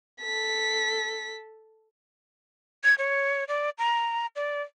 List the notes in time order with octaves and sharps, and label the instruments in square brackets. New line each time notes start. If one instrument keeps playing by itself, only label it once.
[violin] A4 B6
[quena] G#6
C#5
D5
A#5
D5